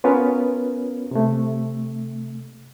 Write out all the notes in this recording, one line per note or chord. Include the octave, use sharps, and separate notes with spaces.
B3 C#4 F4 A#4 B4 C#5
C3 A3